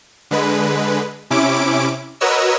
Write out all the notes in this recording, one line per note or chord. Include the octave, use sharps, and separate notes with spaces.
D3 G#3 B4
C3 C#4 E4 D6 D7
F#4 A#4 B4 C#5 D#5 E6